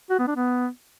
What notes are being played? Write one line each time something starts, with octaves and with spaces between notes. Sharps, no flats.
F#4
B3
D4
B3